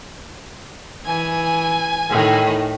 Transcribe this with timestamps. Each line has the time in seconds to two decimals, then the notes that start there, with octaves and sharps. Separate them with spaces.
1.06 E3 G#5
2.10 A2 D#3